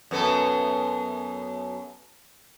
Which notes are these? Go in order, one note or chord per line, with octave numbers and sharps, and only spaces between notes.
F#2 B3 A4